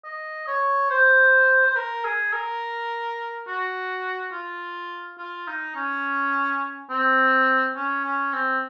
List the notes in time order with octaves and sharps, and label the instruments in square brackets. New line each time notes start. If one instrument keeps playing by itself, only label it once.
[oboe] D#5
C#5
C5
C5
A#4
G#4
A#4
F#4
F4
F4
D#4
C#4
C4
C#4
C#4
C4